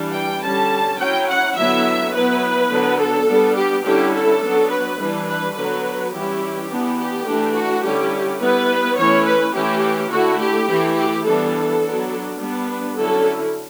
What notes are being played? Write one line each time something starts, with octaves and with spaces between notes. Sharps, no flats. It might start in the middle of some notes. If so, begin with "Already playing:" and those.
Already playing: E3 G3 D4
G5
D3 G3 C#4 A5
F#3 C#4 E4 G5
F#5
D3 F#3 B3 E4 E5
F#3 B3 E4 B4
D3 F#3 B3 D4
A4
G3 B3 D4
G4
D3 G3 C#4 E4 G4
A4
F#3 B3 D4
B4
E3 G3 D4
B4
D3 F#3 B3 B4
E3 G3 C#4 E4 G4
E3 B3 D4
G4
E3 A3 D4
F#4
D3 G3 C#4 E4 G4
G3 B3 E4 B4
E3 A3 C#4 E4 C#5
B4
E3 A3 C#4 E4 G4
D3 A3 E4 F#4
G4
E3 A3 E4
G4
E3 G3 B3 D4 A4
F#3 B3 D4
G3 B3 D4
B4
D3 F#3 C#4 E4 A4